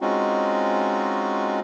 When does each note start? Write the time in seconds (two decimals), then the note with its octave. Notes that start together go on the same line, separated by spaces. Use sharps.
0.01 G#3 C4 C#4 D#4 F4 F#4